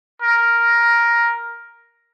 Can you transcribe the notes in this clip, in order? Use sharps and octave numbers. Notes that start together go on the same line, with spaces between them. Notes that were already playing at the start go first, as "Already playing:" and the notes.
A#4